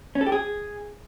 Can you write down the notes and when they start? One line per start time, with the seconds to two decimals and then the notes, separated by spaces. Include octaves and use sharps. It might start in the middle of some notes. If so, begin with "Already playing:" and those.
0.15 C#4
0.21 A4
0.27 G4
0.32 G#4